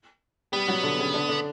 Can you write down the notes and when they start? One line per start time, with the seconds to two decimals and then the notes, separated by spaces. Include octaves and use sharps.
0.52 G3 B3 G4
0.67 F#3 F#4
0.83 D3 D4
0.98 C#3 C#4
1.14 D3 D4
1.29 D3 D4